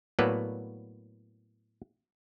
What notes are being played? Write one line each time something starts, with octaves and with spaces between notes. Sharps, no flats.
A2 F#3 A#3 B3 B4 D5